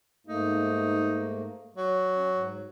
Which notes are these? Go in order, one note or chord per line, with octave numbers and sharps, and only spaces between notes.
G#2 A3 A#3 D#4
F#3
C#4
G#2